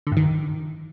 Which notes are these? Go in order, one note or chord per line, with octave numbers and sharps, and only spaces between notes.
D3
G2
D#3